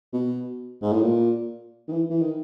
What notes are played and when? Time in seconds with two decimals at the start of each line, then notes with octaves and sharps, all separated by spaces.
0.13 B2
0.82 G#2
0.92 A2
1.03 A#2
1.88 D#3
1.92 E3
2.10 E3
2.22 D#3